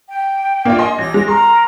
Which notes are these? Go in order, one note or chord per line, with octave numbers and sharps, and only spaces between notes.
G5
A#3 D4 F4
D#5 G#5 C6
A1 A#6
G#3
A#4 C6